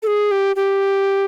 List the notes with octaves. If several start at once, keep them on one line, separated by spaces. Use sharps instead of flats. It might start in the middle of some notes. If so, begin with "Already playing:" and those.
A4
G#4
G4
G4